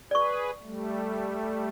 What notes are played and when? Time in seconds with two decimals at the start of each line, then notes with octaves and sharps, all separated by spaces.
0.11 G#4 B4 D5 C#6
0.62 G3 A3